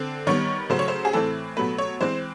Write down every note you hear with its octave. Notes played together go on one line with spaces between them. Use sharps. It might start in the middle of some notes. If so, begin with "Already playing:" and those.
Already playing: D3 C4
D#3 G3 B3 C#5
C#3 F#3 A3 C5
C#5
C5
G#4
A2 E3 A3 C4 A4
B2 F#3 A3 B4
C#5
E3 G#3 C4 C5